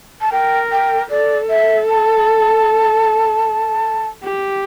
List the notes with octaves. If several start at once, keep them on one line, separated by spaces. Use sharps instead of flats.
A5
A#4 G5
G5
A4 D5
E5
A5
G4